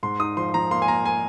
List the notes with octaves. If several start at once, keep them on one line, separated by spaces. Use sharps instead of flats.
G#2 C6
D#4 D#6
F3 C6
F3 A#5
A#3 C6
G#5
A#3 A#5
G#5